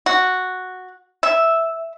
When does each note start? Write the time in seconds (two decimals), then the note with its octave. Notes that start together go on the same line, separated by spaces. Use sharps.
0.06 F#4
1.23 E5